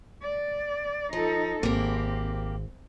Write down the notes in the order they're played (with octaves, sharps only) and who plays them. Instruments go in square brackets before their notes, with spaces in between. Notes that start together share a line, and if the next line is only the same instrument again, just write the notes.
[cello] D5
[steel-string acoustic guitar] F3 [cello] D#4 A4
[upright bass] G#1 [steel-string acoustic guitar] A#3 G4 [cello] C4